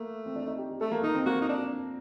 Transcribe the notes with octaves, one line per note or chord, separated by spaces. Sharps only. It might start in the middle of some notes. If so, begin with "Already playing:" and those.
Already playing: A3 A#3
C4
D4
D#4
G4
G4
A3 A4
A#3
A#3 D#4
C4
A#3 F#4
D#4
D4